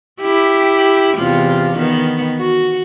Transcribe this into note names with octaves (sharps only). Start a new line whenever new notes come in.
E4 G4
E2 C3 F4
D#3 B3
F#4